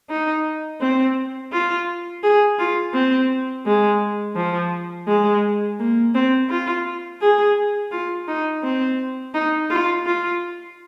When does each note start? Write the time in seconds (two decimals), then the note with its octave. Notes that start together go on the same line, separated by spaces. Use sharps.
0.10 D#4
0.81 C4
1.52 F4
2.23 G#4
2.59 F4
2.94 C4
3.66 G#3
4.36 F3
5.08 G#3
5.79 A#3
6.14 C4
6.49 F4
7.21 G#4
7.92 F4
8.28 D#4
8.63 C4
9.34 D#4
9.70 F4
10.06 F4